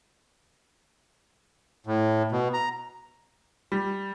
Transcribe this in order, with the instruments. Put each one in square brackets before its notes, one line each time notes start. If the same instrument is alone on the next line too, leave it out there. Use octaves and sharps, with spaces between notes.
[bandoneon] A2
B2
A#5
[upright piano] G3